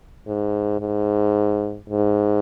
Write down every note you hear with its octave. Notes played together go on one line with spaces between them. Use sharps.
G#2
G#2
G#2